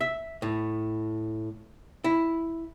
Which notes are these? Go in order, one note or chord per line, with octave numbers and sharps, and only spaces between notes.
E5
A2
E4